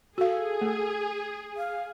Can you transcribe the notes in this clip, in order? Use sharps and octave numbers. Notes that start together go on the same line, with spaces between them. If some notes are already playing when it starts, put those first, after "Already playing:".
F#4 G#4 A4 F5
A3
F5